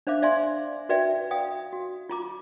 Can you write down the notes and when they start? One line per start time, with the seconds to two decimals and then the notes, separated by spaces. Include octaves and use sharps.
0.07 D4 C5 E5 F5 D6
0.22 D5 E5 F5 G#5 C6
0.89 F#4 B4 D5 E5 G5
1.31 F5 G5 D#6
1.73 F#4
2.09 F4 A#5 D6